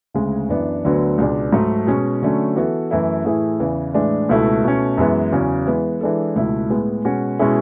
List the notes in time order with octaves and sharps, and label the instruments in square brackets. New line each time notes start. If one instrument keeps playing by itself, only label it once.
[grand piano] D2 C#3 G#3
F#2 E3 B3 D4
D2 D3 F#3 B3
C#2 B2 G#3 D4
G#2 F#3 A3
B2 G#3 C#4 G#4
D3 F#3 A3 C#4
E3 B3 F#4 A4
F#2 E3 A3 E4
A2 E3 A3 E4 G#4
E2 C#3 E3
A2 E3 G#3 D4
C#2 B2 A3 E4 A4
B2 A3 C#4
F#2 E3 G#3 B3
E2 C#3 F#3 C#4
E3 G#3 B3
E3 G#3 D4 A4
C#2 B2 A3 E4
A2 G#3 B3
B2 G#3 C#4 F#4
B2 G#3 C#4 E4 G#4